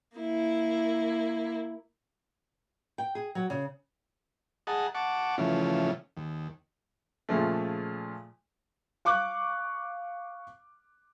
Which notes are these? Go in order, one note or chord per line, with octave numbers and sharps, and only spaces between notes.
A#3 E4
G5
G#4
F#3
C#3
G#4 D#5 F#5 A5 A#5
F#5 A5 C#6 D6
C#3 E3 F3 A3 C#4
D#2
A#2 C#3 F3 G#3 A3
F5 C#6 D6 F#6